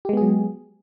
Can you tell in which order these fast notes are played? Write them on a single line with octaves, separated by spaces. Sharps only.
G4 G#3 B3 G#4 F#3